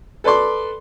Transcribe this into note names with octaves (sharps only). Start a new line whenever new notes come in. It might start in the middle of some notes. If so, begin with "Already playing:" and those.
A4 B4 D5 C6 D6